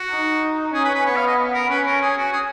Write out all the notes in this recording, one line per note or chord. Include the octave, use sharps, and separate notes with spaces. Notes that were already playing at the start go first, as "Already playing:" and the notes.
Already playing: F#4
D#4
C#4 G#4
B4
B4
B3 C#5
F5
D#5
A#4
C#4 B4
A#4
G#4
F#4
G#4